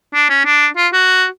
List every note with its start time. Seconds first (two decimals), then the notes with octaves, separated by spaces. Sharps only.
0.14 D4
0.30 C#4
0.45 D4
0.77 F4
0.93 F#4